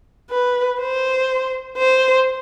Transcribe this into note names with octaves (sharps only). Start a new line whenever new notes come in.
B4
C5
C5